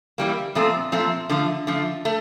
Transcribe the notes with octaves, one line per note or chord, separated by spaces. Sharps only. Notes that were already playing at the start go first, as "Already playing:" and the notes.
E3 G3 A#3
A#2 F3 A3 C4
A#2 F3 A3 C4
D3 F3 A3
D3 F3 A3
A3